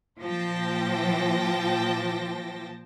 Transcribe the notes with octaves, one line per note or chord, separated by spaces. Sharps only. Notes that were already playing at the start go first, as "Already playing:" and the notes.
A#2 F3 C5 G5 A5 A#6